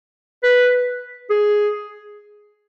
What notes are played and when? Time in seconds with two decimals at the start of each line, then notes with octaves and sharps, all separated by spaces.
0.43 B4
1.30 G#4